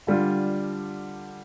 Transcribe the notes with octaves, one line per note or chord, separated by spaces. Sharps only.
D3 G3 D4 F4